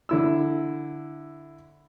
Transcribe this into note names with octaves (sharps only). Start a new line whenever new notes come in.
D3 E4 E6